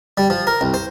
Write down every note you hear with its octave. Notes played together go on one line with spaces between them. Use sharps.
G3
F3
A#4
C2
C5